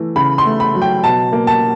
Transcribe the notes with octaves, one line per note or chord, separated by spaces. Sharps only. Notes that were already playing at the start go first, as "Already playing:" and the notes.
Already playing: E3 A3
C#3 B5
C6
A3
B5
F#3
G5
B2 A5
A#3
A5